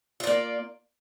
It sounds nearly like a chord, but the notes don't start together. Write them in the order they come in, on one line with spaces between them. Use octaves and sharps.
F4 D5 A#3